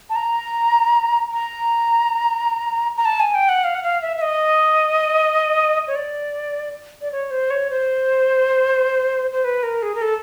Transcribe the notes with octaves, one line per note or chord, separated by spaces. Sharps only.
A5
A#5
A#5
A#5
A5
G#5
G5
F#5
F5
F#5
F5
E5
E5
D#5
C#5
D5
D5
C#5
C5
C#5
C5
C5
B4
A#4
G#4
A#4
A4